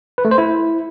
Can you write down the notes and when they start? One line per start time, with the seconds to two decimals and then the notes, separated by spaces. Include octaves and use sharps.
0.18 B4
0.25 A3
0.31 C5
0.38 E4